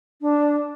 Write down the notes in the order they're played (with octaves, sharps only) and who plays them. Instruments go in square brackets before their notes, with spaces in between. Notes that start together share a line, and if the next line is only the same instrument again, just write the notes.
[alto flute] D4